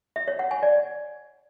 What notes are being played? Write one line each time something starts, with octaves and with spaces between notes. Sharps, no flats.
E5
C#5
F#5
G#5
D5